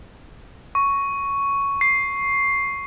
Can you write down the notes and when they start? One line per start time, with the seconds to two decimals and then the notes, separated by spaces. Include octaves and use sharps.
0.75 C#6
1.81 C7